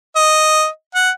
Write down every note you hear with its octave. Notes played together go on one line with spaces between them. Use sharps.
D#5
F#5